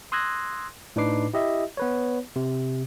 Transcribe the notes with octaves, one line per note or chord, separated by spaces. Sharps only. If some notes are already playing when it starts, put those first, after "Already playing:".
C6 D#6 E6 F#6 G#6 A#6
A2 D4 D#4 B4 D6 C7
E4 G4 D#5 E5
B3 B4 C#5
C3